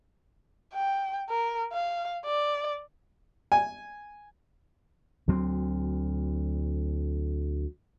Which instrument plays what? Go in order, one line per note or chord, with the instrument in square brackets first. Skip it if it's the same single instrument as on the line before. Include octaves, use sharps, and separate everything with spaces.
[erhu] G5
A#4
F5
D5
[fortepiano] G#5
[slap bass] D2 F#3 C4